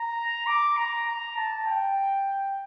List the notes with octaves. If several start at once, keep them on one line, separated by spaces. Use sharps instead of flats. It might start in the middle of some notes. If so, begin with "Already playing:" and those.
Already playing: A#5
D6
A#5
A#5
A5
G5